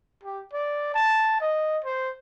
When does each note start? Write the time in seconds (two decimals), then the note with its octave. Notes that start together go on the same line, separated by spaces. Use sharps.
0.24 G4
0.53 D5
0.94 A5
1.41 D#5
1.84 C5